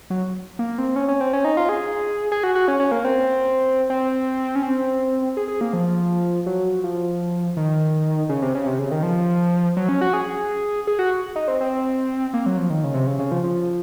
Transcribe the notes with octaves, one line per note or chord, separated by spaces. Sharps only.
F#3
A#3
C4
C#4
C#4
C4
C#4
D#4
F4
G#4
G#4
F#4
F#4
C#4
C#4
A#3
C4
C4
C#4
C4
G#4
G#4
A#3
F3
F#3
F3
D#3
C#3
C3
C#3
C3
C#3
D#3
F3
F#3
C#4
F#4
G#4
G#4
F#4
D#4
C4
C4
A#3
F#3
F3
D#3
C#3
C3
C#3
C#3
F3
F3